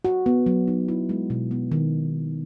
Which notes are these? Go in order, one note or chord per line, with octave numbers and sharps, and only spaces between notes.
F#4
B3
F#3
D#4
E4
G#3
B2
B3
D#3